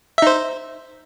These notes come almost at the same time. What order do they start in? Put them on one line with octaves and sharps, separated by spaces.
E5 D#4 C5